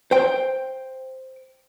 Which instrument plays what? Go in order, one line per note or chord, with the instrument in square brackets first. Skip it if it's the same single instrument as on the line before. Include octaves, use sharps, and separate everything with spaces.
[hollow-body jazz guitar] C5 G5